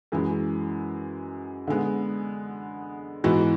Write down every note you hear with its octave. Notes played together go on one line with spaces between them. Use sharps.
F#2 E3 G#3
D3 G#3 B3
G#2 E3 B3 F#4